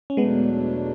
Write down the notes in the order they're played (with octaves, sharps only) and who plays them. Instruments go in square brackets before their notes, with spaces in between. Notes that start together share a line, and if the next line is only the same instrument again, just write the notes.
[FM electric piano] C#4
[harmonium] E2 B2 F#3 A3 D4 [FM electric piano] G#3 B3